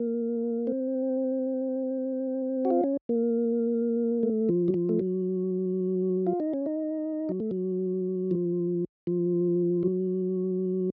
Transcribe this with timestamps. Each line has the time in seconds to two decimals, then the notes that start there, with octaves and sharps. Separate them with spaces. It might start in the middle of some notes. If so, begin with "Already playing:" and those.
Already playing: A#3
0.67 C4
2.65 F#4
2.70 F4
2.84 C#4
3.09 A#3
4.23 A3
4.49 F3
4.68 F#3
4.74 F3
4.89 A3
4.99 F#3
6.27 F4
6.40 D#4
6.53 C#4
6.66 D#4
7.29 F#3
7.40 A3
7.51 F#3
8.31 F3
9.07 F3
9.83 F#3